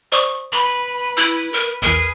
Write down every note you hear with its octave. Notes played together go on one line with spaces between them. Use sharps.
C5 D5 C#6 D#6
B4 B5
E4 E6 F#6
A#4
A#1 E2 G#4 A#4 B4